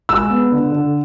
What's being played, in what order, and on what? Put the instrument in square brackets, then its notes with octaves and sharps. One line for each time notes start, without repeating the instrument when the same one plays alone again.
[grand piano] G#3 E6
B3
D3
D3